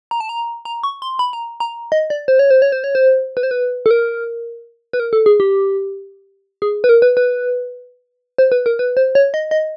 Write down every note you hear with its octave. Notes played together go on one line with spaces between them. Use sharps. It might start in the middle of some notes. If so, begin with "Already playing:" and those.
A#5
A5
A#5
A#5
C#6
C6
B5
A#5
A#5
D#5
D5
C5
C#5
C5
C#5
C5
C#5
C5
B4
C5
B4
A4
A#4
B4
A#4
A4
G#4
G4
G#4
B4
A#4
B4
B4
C5
B4
A#4
B4
C5
C#5
D#5
D#5